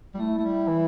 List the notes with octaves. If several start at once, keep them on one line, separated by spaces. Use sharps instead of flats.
G3
A3 E4
A3
G3
E3